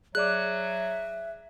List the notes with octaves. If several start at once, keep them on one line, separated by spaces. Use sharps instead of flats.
F#3 G#4 D5 E5 D6 F#6